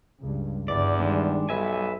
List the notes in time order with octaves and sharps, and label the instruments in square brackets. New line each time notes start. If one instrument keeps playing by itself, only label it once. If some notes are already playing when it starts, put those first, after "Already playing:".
[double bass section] C#2 G2
[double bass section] G1 [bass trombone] E2 [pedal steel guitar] D5
[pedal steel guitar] D#3 G#3 D4 [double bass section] G3
[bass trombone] B1 [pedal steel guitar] B4 E5 G#5